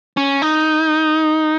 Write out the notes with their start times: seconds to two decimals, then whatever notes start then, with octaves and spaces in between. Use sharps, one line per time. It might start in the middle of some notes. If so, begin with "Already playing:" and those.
0.17 C#4
0.42 D#4